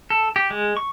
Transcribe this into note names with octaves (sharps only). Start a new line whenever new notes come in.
A4
G4
G#3
C#6